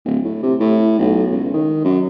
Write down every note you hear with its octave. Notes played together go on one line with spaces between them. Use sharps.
D1
A2
C3
A2
B1
C#2
D#3
F#2